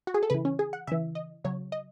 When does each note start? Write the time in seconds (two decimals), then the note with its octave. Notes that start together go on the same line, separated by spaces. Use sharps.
0.07 F#4
0.14 G#4
0.23 A4
0.30 C#3 E3 B4
0.45 C#4
0.59 G#4
0.73 F#5
0.87 C#3 E3 E5
1.15 D#5
1.44 C#3 F#3 C#5
1.72 D#5